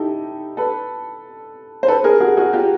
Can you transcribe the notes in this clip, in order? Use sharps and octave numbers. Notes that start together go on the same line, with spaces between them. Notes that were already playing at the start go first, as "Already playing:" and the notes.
Already playing: D#4 E4 G4 A4
A4 B4
C5
A4 B4
G#4 A#4
F#4 G#4
F#4 G#4
F4 G4